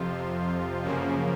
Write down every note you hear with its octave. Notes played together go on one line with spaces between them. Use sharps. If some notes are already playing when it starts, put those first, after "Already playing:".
Already playing: F2 C3 F3 F4
F#2 C#3 F3 A#3